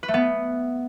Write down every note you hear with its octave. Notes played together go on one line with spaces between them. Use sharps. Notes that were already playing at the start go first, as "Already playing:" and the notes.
B4
A3
B3